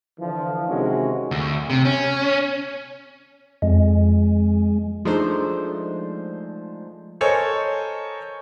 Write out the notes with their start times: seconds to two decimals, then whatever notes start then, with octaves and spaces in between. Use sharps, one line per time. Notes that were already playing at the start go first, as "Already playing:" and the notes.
0.19 D3 E3 F3
0.68 C3 D#3 G#3 C#4 F#4
1.31 D2
1.70 C3
1.85 C#4
3.62 F2 G#3
5.05 F3 G#3 A3 D4 D#4 C5
7.21 A4 A#4 C5 C#5 D#5 G#5